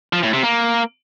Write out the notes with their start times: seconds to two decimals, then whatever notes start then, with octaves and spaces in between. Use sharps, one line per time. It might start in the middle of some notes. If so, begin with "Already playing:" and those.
0.13 F3
0.23 A2
0.33 C3
0.43 A#3